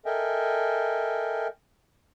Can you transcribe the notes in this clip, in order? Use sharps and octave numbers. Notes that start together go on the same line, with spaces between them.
A4 A#4 D#5 E5 G5 G#5